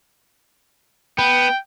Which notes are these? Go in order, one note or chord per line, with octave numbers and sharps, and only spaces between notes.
B3 G5